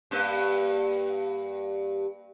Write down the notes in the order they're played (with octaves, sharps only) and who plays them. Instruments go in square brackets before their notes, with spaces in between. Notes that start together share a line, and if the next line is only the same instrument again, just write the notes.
[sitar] G2 A#3 B4